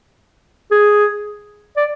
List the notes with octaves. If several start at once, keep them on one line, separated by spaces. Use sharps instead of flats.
G#4
D5